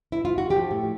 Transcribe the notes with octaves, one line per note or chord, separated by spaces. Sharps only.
E4
F4
F#4
F3 G4
A2